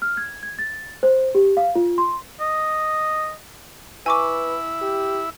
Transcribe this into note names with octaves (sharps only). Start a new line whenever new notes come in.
F6
G#6
G#6
A6
C5
G4
F5
F4
C6
D#5
E4 B4 G#5 C#6 D6
G4